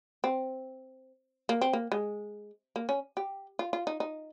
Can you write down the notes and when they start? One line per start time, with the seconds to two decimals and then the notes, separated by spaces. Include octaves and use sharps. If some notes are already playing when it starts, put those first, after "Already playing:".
0.24 C4
1.49 A#3
1.61 C4
1.73 A#3
1.92 G#3
2.76 A#3
2.89 C#4
3.17 G4
3.59 F4
3.73 F4
3.87 D#4
4.00 D#4